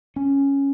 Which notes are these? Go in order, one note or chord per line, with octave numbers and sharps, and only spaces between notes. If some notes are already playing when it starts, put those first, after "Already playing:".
C#4